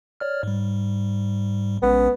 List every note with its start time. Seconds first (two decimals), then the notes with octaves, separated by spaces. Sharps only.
0.20 C#5 D5 F6
0.43 G#2 G3
1.82 A#1 G#3 B3 C#4